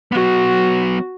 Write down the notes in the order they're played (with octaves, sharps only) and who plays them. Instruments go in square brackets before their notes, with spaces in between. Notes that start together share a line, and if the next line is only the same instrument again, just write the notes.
[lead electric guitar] F#3 B3 [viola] F#4